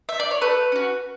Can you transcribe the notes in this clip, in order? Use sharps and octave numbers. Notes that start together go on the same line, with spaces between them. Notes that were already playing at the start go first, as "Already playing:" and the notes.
E5
D5
C#5
A3 B4
C#4 F#4